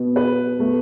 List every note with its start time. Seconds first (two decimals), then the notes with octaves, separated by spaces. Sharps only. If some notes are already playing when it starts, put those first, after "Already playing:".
Already playing: B2 B3
0.16 B4
0.59 B2 A3